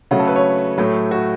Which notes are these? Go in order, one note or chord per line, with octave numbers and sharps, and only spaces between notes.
C#3 F#3 A3 F#5
A4
B4
C#5
A2 F#3 A3
F#4